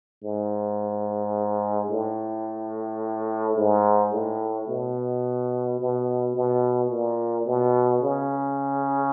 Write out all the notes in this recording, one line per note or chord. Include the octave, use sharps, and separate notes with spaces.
G#2
A2
G#2
A2
B2
B2
B2
A#2
B2
C#3